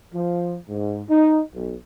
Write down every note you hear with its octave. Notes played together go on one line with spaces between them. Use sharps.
F3
G#2
D#4
B1